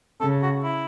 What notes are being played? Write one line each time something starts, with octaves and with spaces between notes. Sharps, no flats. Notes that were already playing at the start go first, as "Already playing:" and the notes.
C#3 A4
F#4
E4